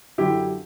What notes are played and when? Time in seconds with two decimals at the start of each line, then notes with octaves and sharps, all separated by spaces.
0.18 F#2 D3 E4 G4